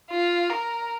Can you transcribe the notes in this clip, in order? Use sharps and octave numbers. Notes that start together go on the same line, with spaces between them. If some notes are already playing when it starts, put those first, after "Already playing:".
F4
A#4